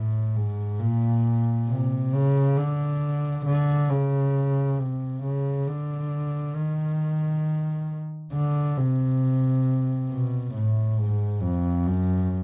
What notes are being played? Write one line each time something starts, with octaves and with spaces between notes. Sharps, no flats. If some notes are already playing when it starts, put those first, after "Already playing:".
Already playing: A2
G#2
A#2
C3
C#3
D3
D3
C#3
C3
C#3
D3
D#3
D3
C3
B2
A2
G#2
F2
F#2